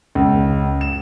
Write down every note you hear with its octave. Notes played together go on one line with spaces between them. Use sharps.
C#2
E7